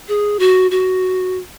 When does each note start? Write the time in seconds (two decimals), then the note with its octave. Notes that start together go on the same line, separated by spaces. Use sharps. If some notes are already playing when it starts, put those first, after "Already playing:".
0.08 G#4
0.39 F#4
0.71 F#4